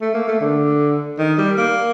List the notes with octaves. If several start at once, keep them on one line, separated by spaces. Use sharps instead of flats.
A3
A#3
A3
D3
D#3
G3
A#3